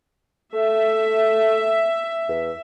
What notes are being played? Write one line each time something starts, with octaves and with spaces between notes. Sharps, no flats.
A3 E5
E2